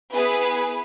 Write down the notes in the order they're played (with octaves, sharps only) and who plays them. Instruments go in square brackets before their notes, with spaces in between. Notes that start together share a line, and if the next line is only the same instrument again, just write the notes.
[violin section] B3 E4 G#4 B4